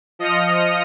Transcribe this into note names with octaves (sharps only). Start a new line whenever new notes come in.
F3 D#5 D#6 F6 A#6 C#7